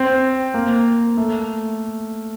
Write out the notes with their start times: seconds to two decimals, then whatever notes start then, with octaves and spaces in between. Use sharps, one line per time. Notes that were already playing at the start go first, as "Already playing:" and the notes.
Already playing: C4
0.54 A#3
1.17 A3